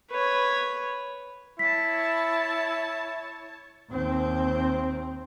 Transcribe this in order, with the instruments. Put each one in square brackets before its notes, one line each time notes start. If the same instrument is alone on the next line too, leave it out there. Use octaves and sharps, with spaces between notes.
[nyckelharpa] B4 C#5
[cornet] E4 [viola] C#5 A5 [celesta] B6
[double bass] D#2 C4